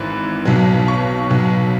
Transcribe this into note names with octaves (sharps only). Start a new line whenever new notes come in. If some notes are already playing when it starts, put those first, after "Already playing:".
Already playing: G#1 G#2 E3 B5
B1 B2 F#3
C#6
B1 B2 F#3